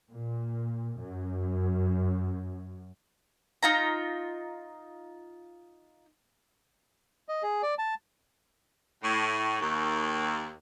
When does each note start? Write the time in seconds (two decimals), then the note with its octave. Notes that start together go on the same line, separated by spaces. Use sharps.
0.12 A#2
0.98 F#2
3.63 D#4 F4 A#5
7.29 D#5
7.43 G#4
7.63 D5
7.79 A5
9.04 A2 C#6
9.61 D#2